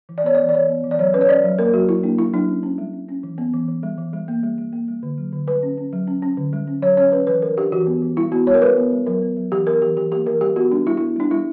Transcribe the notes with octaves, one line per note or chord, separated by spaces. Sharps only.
E3
D5
B3 C#5
E3 D5
D5
E3 C#5
B3
E3
D5
F#3 C#5
C#4 B4
C#5
C#4 D5
F#3
A#3 A#4
F#3 F#4
F#3 E4
A#3 D4
F#3 E4
F#3 D4
C#4
C#4
G3
C#4
C#4
E3
B3
E3
E3
G3
E3
G3
A#3
G3
G3
A#3
G3
D3
F#3
D3
G3 B4
C#4
C#4
F#3
C#4
C#4
D3
G3
C#4
F#3 C#5
C#4 C#5
C#4 B4
E3 B4
G3 A#4
D4 G4
E3 F#4
B3
E3
G3 E4
B3 F#4
G3 C#5
A#4
G3 B4
B3
G3
F#3 A#4
B3
F#3
E3 G4
B3 A#4
E3 G4
E3 G4
A#3 G4
E3 A#4
G3 G4
B3 F#4
G3 D4
G3 E4
B3 E4
G3 D4
G3 E4